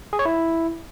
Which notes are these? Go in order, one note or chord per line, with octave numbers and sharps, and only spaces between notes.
G#4
C#5
E4